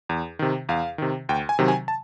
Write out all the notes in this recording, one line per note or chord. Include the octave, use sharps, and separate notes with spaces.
E2
C3 D#3
E2 F5
C3 D#3
D2 G5
G#5
C3 D#3 F#3
G#5
A5